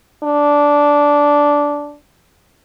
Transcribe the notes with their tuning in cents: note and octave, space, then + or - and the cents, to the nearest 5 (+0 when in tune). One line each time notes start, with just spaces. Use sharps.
D4 -10